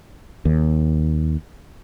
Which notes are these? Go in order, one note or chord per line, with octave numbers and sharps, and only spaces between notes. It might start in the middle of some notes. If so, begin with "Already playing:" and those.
D#2